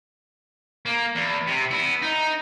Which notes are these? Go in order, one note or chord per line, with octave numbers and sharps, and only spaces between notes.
A#3
E2
C3
B3 E4
D#4